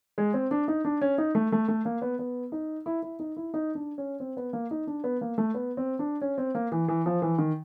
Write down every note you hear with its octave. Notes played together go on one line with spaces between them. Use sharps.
G#3
C4
D4
D#4
D4
C#4
D#4
A3
A3
A3
A#3
B3
B3
D#4
E4
E4
D#4
E4
D#4
D4
C#4
C4
B3
A#3
D#4
D4
B3
A#3
A3
B3
C4
D4
C#4
C4
A#3
E3
E3
F3
E3
D#3